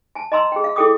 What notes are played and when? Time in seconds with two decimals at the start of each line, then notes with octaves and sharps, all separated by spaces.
0.15 G#5 A5
0.32 D#5 G#5 A#5 C6 E6
0.52 G#4 G5
0.64 F5
0.76 E4 G#4 A4 G5 D6 D#6